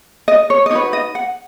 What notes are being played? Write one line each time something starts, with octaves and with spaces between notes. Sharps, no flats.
D#5
C#5
D#5
D#4 F#4 B4 C#5
D#5
F#5